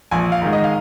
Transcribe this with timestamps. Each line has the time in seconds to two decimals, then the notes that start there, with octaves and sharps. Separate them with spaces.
0.11 A#1 G#5
0.32 F5
0.42 G#2 D#3 G#3
0.53 D#5
0.64 F5